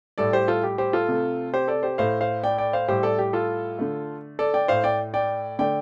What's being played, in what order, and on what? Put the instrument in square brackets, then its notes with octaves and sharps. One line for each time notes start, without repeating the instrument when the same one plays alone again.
[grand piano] A2 G3 A4 D5
G4 C5
F4 A4
G4
G4 C5
F4 A4
C3 A3
G4 C5
A4 D5
G4 C5
A2 A3 C5 F5
C5 F5
D5 G5
D5 G5
C5 F5
A2 G3 G4 C5
A4 D5
G4
F4 A4
D3 A3
A4 D5
D5 G5
A2 A3 C5 F5
D5 G5
D5 G5
D3 A3 D5 G5